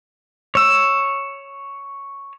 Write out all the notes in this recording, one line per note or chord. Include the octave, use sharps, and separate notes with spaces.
C#5 E6